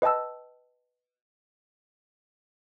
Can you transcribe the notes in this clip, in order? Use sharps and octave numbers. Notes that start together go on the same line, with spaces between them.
B4 D#5 G5 A5 E6